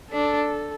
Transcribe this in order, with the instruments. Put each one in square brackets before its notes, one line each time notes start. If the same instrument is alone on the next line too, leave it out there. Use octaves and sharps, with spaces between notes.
[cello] D4 [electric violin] A4